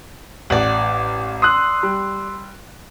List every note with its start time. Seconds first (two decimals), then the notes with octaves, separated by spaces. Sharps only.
0.50 A1 D5 F#5
1.42 C6 D#6 E6 F#6 C7
1.83 G3